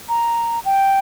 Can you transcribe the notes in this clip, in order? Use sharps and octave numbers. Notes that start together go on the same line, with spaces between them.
A#5
G5